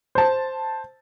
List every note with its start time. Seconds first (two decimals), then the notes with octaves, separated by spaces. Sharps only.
0.15 C5 A5